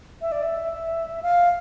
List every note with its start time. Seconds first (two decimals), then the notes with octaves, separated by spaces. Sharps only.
0.22 E5
0.32 D5
0.43 E5
1.23 F5